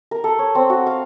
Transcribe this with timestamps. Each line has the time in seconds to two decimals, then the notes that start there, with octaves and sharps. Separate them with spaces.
0.11 A#4
0.24 A4
0.39 C#5
0.55 C4
0.70 F#4
0.87 F5